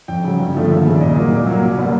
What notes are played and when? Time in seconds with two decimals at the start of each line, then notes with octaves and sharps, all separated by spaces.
0.08 F2 G5
0.24 C#3 F#3
0.40 G2
0.55 D3 F3 A3
0.70 D#2 E5
0.85 C#3 F3 G#3
0.94 D5
1.00 A#2 D#5
1.16 F#3 A#3
1.31 A#2 D5
1.46 F#3 A#3
1.62 C2
1.78 B2 G3 A#3